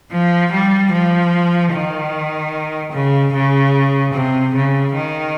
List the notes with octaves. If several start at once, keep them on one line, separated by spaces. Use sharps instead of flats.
F3
G3
F3
D#3
C#3
C#3
C3
C#3
D#3